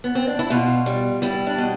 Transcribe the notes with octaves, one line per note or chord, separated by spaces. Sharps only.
B3
C4
D4
E4
B2 F4
G3
G3 E4
D4
B2